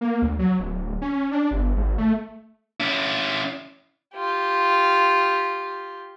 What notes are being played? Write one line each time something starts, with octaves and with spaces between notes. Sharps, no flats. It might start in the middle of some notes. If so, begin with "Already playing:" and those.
A#3
D2
F#3
D1
C#4
D4
G1
G#1
A3
C#4 E4
F4 G4